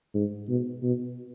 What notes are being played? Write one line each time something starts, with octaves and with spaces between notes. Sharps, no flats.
G#2
B2
B2